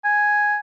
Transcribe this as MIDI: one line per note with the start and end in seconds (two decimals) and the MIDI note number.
0.05 0.58 80